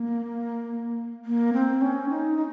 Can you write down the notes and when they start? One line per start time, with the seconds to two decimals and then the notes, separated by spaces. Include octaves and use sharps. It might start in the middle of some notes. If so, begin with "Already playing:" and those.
Already playing: A#3
1.25 A#3
1.53 C4
1.81 C#4
2.09 D#4
2.37 D#4